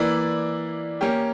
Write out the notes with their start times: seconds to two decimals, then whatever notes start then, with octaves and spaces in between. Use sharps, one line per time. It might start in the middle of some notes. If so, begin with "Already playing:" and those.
Already playing: E3 A#3 E4 B4 D5
1.01 A#3 C#4 G4